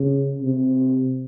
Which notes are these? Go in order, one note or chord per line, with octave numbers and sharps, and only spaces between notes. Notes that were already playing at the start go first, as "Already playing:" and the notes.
Already playing: C#3
C3